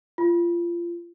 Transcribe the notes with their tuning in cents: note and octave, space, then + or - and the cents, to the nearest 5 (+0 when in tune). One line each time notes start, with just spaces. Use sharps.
F4 -25